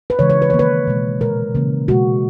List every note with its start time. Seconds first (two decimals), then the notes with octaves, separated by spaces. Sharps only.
0.10 B4
0.19 C#3 E3 G#3 C#5
0.30 C#5
0.42 B4
0.50 D#3 A#3 C#5
0.59 B4
0.87 B2 G#3
1.20 A#2 G#3 A#4
1.55 C#3 E3 A#3
1.88 B2 G#3 F#4